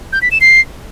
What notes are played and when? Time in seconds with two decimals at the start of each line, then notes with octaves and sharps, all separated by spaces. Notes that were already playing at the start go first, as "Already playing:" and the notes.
0.13 G6
0.22 B6
0.31 E7
0.41 C7